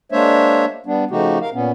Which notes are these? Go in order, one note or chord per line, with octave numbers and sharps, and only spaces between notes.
G#3 A#3 D4 C5 C#5 E5
G3 B3 D4
C#3 F3 A3 D#4 F#4 G4
A#4 F5
A#2 B3 C#4